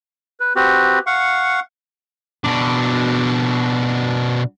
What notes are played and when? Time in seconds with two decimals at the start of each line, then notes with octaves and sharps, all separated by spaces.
0.40 B4
0.56 C4 F#4 G4 B4
1.07 F5 F#5 C#6
2.44 B2 D4